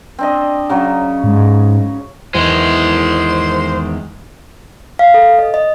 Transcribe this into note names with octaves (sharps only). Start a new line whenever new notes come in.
C4 D4 D#5
C#3 F#3 C#5
G#2
E2 D#3 G#3 C5
F5
A4
D#5
D#5